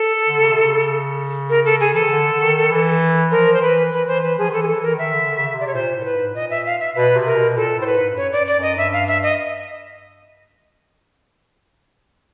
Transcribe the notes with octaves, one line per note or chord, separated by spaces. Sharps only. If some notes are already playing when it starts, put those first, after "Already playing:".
Already playing: A4
D3
C#3
C3
C#3
A#4
A4
G#4
E3 A4
D#3
D3
D3
D#3
E3
F3 A#4
C5
E3 B4
E3 B4
E3 C5
E3 B4
F3 G#4
D#3
E3 A4
G#4
A4
E3
A#4
D#3 E5
D3
D3
C#3
C3
D5
C#5
A#2 C5
A2
A#4
B4
G#2
A#2 D#5
E5
F5
E5
B2 B4
C3
A#4
B2
A#2 A4
A2 C5
B4
G#2
G2
F#2 C#5
F#2 D5
D5
F#2 D#5
G2 E5
F5
E5
D#5